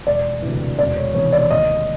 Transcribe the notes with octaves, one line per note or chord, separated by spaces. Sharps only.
E1 D5
D2 C3 E3
E1 D5
C#5
E2 C3 D#3 C#5
D5
D#2 D#5